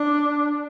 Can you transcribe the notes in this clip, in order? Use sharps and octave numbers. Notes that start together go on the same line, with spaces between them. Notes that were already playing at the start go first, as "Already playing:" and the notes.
Already playing: D4